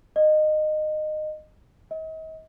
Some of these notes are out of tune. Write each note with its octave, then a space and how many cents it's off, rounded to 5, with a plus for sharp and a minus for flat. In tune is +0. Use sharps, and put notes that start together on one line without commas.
D#5 -20
D#5 +40